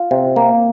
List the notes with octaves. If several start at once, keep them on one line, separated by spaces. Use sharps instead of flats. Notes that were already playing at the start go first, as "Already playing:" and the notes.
Already playing: F4
C3
A#3